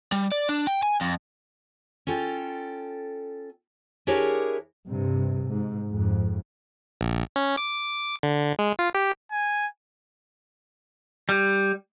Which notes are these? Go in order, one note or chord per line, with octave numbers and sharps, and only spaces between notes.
G3
D5
D4
G5
G#5
F2
C#4 F4 A4 G5
D4 E4 G4 G#4 A#4 C#5
G2 C3
G#2
F2 G#2
A#1
C#4
D6
D3
G#3
F4
G4
G#5
G3